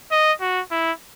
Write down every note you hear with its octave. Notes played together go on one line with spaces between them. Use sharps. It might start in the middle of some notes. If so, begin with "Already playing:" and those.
D#5
F#4
E4